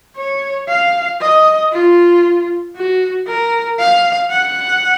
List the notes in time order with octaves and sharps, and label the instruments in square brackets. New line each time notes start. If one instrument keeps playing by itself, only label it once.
[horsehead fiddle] C#5
F5
D#5
F4
F#4
A#4
F5
F#5